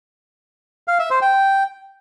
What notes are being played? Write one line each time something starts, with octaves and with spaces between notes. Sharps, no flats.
F5
E5
C5
G5